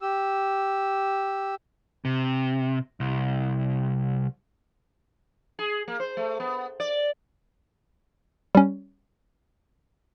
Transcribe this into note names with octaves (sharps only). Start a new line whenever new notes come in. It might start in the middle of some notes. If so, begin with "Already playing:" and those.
G4 E6
C3
C2
G#4
A#3
C5
A3
B3
D5
G3 C#4